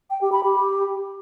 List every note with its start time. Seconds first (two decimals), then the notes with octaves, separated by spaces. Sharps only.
0.10 G5
0.21 G4
0.32 B5
0.43 G4